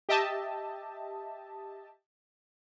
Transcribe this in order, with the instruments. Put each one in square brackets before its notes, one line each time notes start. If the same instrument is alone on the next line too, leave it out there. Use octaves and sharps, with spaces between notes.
[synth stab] G4 D#5 E5 A5